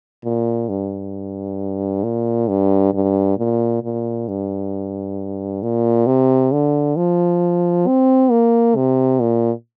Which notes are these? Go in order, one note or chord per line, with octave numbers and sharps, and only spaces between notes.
A#2
G2
A#2
G2
G2
A#2
A#2
G2
A#2
C3
D3
F3
C4
A#3
C3
A#2